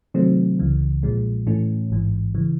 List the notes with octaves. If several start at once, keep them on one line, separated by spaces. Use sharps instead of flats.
C3 D#3 F#3 A3 C4
C#2 C#3 E3
B1 A#2 F3 G#3
A2 E3 A3 C#4
A1 G#2 E3
C#3 E3